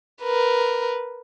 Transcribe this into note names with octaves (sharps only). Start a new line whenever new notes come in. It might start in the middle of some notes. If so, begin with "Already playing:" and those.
A#4 B4